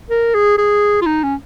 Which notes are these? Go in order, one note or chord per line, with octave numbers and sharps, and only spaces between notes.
A#4
G#4
G#4
F4
D#4
C#4